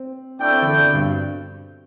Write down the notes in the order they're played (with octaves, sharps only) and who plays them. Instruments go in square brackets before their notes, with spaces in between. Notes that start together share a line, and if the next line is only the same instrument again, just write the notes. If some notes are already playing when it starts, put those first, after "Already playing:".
Already playing: [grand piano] C4
[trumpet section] A3 E4 A4 D5 G5 [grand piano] D4
[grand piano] C4
D3
D3
B2
G2